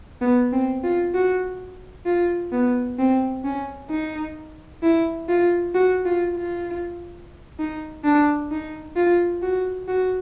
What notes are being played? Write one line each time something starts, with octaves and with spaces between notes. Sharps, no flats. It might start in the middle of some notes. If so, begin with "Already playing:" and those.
B3
C4
F4
F#4
F4
B3
C4
C#4
D#4
E4
F4
F#4
F4
F4
D#4
D4
D#4
F4
F#4
F#4